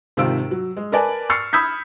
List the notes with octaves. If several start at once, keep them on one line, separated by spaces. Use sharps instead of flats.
G#1 C3 D#3 F4 E6 D7
F#3
G#3
A#4 B4 D5 G#5 A5
C#6 E6 F6 A6 C7 C#7
B5 D#6 E6 G6 G#6 B6